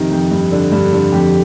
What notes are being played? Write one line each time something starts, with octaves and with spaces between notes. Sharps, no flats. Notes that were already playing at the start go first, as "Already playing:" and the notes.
Already playing: F2 C3 D#3 D#4
F2
G2
D3
G2
D3
F2 G4